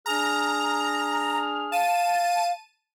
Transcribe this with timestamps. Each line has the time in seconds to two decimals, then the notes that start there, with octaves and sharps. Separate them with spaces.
0.06 D4 G#4 A#5 F6
1.72 F5 A5 D#7